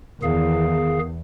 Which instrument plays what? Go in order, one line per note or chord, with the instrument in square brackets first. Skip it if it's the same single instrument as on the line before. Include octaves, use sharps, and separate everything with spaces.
[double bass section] E2 [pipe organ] D#3 G#4 F5